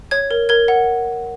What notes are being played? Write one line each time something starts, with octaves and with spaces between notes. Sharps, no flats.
C#5 G#6
A#4
A#4 G#6
F#5